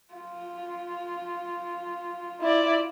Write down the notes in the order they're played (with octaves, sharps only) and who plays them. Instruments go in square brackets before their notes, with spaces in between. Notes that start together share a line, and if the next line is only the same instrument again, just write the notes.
[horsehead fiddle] F4
[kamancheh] E4 D5